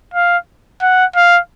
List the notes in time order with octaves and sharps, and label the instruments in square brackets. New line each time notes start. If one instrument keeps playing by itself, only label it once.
[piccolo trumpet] F5
F#5
F5